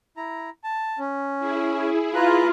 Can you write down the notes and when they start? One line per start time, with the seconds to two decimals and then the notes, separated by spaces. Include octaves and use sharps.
0.17 E4 A#5
0.64 A5
0.99 C#4
1.39 E4 G#4
2.15 F4 B4 A#5 F#6